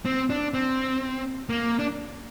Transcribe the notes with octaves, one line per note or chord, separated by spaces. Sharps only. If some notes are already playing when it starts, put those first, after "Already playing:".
C4
D4
C4
A#3
D4